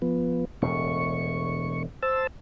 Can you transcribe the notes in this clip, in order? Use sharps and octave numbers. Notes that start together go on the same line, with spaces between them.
F3 B3
E1 A2 C#6
C5 A5 E6